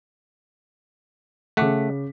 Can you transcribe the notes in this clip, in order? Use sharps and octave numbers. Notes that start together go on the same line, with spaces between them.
C#3 A3 F#5 D6 B6